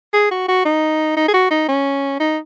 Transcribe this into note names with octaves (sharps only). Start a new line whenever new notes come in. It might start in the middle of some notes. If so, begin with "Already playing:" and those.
G#4
F#4
F#4
D#4
D#4
G#4
F#4
D#4
C#4
D#4